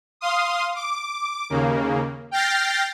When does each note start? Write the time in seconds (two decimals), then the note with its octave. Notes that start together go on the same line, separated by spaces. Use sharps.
0.21 F5 C6 D#6
0.75 D6
1.50 D#2 C#3 A#3
2.31 G5 F6 G6 A6 A#6 C7